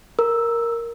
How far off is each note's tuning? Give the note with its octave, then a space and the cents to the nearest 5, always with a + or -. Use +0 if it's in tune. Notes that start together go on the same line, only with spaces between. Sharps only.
A#4 +0 E6 +0